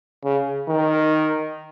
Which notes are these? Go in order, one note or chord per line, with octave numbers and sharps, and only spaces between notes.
C#3
D#3